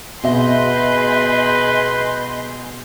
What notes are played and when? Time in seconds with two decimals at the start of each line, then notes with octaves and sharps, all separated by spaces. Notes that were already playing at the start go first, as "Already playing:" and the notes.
0.23 B2 G#4 B4 D#5 E5 C6 G6